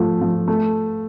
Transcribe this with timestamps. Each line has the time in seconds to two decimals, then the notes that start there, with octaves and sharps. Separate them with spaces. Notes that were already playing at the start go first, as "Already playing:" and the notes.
Already playing: F3 A3
0.21 F3
0.48 A3